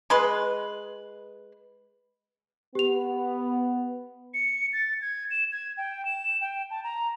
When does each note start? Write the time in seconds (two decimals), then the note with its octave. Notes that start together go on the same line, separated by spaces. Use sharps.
0.10 G#3 B4 C6
2.75 B3 G4 F7
4.34 C#7
4.73 A6
5.02 G#6
5.31 E7
5.52 G#6
5.77 G5
6.05 E7
6.41 G5
6.70 A5
6.84 A#5